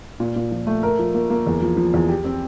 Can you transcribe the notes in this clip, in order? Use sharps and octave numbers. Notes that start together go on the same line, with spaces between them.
A#2
A#2
F3
A3
A#4
F3
A#3
A#3
E2
F3
F3
E2
G4
C4